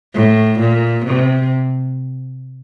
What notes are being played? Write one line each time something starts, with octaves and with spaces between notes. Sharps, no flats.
A2
A#2
C3